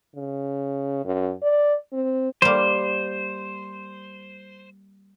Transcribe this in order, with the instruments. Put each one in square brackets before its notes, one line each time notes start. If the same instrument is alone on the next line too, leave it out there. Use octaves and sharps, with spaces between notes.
[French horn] C#3
F#2
D5
C4
[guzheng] G3 A#3 [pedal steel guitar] C5